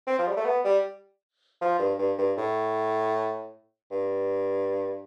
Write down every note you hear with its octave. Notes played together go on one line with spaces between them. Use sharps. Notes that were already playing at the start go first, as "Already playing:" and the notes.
C4
F3
G3
A3
B3
G3
F3
G2
G2
G2
A2
G2